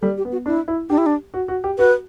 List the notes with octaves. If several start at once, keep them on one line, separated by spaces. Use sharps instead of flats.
G3 A4
G4
B3
F#4
D4 E4
E4
D4 G4
E4
D4
F#4
F#4
G4
F#4 B4